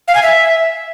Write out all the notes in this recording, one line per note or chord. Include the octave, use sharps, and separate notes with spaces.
F5
G#5
E5